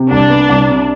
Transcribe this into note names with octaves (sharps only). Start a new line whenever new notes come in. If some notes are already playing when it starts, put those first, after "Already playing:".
Already playing: C3
C2 D4
B3
C2
C3